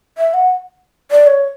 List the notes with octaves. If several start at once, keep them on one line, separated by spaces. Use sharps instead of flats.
E5
F#5
D5
C#5